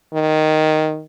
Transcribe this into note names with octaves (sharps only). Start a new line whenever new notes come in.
D#3